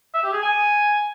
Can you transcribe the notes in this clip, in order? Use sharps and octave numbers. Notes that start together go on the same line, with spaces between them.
E5
G4
G#4
G#5